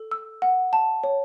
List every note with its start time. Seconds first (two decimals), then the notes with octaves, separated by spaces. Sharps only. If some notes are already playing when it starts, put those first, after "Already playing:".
Already playing: A4
0.11 E6
0.42 F#5
0.73 A5
1.04 C#5